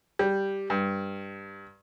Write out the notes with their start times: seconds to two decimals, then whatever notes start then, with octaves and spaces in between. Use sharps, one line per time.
0.19 G3
0.70 G2